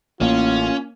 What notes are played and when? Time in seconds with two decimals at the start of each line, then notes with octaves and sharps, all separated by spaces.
0.21 A1 A2 A#3 C#4 F4